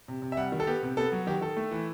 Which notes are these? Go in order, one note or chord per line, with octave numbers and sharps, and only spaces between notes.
C3
C3
E5
G3 F#5
D#3
A4
B3 G4
C3
B3 A4
F#3
D#3 G4
D#3 A4
A3
E3